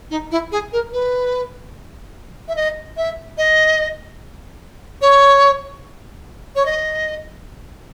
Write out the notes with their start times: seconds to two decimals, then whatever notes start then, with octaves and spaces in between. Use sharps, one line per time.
0.10 D#4
0.31 E4
0.52 G#4
0.72 A#4
0.92 B4
2.48 E5
2.56 D#5
2.97 E5
3.37 D#5
5.01 C#5
6.55 C#5
6.65 D#5